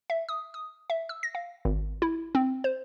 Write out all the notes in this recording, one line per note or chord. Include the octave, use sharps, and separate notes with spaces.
E5
D#6
D#6
E5
E6
A#6
F5
G#1
E4
C4
C5